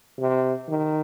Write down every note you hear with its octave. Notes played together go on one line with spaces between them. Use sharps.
C3
D#3